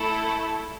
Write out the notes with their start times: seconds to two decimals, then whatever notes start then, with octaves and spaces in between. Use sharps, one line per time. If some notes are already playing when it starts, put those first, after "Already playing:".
Already playing: A3 E4 A4